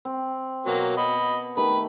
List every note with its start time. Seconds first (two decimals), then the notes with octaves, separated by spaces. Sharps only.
0.05 C4
0.66 B2 F#3 A#3
0.97 D#5 B5
1.57 D#3 A3 G4 B4 B5